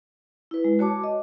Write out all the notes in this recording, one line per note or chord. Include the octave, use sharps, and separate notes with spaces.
E4 B4
G#3
F#4 C#5 A5 D6
D#5